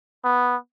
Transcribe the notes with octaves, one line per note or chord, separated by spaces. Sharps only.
B3